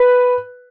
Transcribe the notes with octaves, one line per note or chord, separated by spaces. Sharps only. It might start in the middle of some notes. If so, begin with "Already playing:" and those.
Already playing: B4